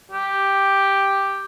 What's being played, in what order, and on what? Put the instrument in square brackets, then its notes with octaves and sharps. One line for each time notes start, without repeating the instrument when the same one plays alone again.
[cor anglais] G4